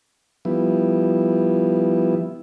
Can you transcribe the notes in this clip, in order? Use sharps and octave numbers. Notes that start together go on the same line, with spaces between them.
F3 G3 B3 E4